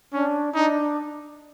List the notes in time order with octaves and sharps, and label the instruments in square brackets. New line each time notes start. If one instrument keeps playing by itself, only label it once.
[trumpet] C#4 [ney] D4
[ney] D4 [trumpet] D#4